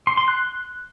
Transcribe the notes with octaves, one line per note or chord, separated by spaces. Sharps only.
C6
C6
F#6